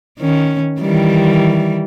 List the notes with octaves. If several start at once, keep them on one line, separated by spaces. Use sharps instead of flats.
D#3 C#4
D#3 E3 G3